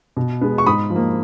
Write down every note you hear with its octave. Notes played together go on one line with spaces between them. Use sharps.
B2
G#3 B3
C#6
G#2 B5 D#6
F3
A#3